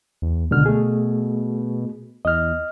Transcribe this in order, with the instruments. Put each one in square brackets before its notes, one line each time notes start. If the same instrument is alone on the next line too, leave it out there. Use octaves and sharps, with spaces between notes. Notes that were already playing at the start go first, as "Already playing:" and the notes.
[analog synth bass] E2
[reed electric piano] C#2 D3 F6 [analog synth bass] B2
[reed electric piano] A3 G#4
[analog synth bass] E2 [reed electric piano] D#5 F6